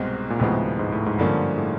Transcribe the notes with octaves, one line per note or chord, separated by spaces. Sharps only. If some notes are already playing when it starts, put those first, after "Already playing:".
Already playing: C2 G#2 B2 G#3 C4
A#2
D2 A2 C3 F3 G#3 B3
G#2
A2
G#2
G2 D3 F3 A#3 C#4
A2